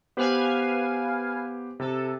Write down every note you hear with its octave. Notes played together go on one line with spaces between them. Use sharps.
B3 G4 B4 C5 F5 G#5
C3 A4